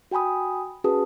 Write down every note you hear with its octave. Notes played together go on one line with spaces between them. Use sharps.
F#4 G5 G#5 B5 D#6
C#4 F#4 G#4 B4 A5 D#6